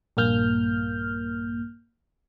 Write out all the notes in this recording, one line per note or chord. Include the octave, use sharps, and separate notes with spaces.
A#1 G2 A#3 F6 G6